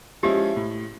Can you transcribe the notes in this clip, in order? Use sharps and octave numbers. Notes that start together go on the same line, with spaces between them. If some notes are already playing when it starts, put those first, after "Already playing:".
F3 G#3 C#4 E4 G4
A2